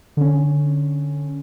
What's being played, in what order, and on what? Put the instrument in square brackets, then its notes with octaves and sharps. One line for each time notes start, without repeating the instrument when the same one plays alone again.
[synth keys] D3 C#4